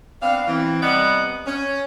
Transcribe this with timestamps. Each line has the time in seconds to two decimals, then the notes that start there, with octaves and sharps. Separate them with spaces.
0.22 B3 C4 D4 F5
0.48 E3 C4
0.82 C3 G3 B3 D5 D#5 F#5
1.47 C#4